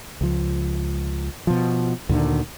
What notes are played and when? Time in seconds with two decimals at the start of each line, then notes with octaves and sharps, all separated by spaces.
0.21 C#2 F3
1.47 B2 F3
2.09 D2 A#2 D3 D#3